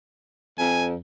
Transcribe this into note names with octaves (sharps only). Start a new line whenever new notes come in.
F2 G#5